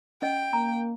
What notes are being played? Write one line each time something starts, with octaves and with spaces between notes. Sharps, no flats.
C#4 D#5 G5
A#3 A#5